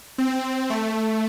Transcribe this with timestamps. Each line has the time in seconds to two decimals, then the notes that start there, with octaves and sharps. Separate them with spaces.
0.18 C4
0.70 A3